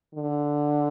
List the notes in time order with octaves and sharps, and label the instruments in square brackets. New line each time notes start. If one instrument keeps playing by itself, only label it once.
[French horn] D3